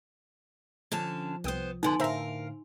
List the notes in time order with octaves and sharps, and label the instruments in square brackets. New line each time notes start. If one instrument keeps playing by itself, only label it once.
[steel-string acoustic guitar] D3 C#4 A5 [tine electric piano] F3
[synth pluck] C2 G5 D#6 [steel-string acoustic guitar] B3 C5
[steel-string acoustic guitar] D3 B3 [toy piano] D#4 G#5 C6
[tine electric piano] A2 D3 [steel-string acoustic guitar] A#4 F5 [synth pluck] C5 E5 A#5